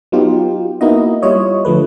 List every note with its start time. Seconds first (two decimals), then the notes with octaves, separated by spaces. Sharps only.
0.12 F#3 B3 D#4 F4 G4
0.81 A#3 B3 D#4 E4 F#4 D#5
1.22 G3 E4 F4 C#5 D#5
1.65 D3 F3 A3 B4